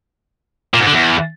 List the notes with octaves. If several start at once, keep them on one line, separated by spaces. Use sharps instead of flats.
A#2
G#2
D3
E2